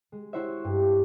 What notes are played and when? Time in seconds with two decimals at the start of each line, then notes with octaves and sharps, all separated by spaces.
0.12 G#3
0.33 E4 F#4 C5 C#5 E5
0.64 G2